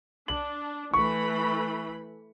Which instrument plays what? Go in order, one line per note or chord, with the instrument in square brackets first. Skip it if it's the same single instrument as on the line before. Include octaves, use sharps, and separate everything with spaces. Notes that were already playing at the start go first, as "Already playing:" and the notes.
[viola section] D4 [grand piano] F#7
[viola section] E3 A3 B5 [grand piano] C#6